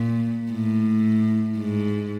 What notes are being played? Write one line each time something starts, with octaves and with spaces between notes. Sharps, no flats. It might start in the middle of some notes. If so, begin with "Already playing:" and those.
Already playing: A#2
A2
G#2